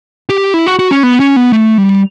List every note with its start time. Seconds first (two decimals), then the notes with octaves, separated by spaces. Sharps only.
0.29 G4
0.54 E4
0.66 F#4
0.79 F#4
0.91 C#4
1.03 B3
1.20 C#4
1.36 B3
1.52 A3
1.78 G3